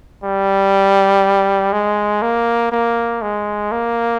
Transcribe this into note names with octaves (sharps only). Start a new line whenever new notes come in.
G3
G#3
A#3
A#3
G#3
A#3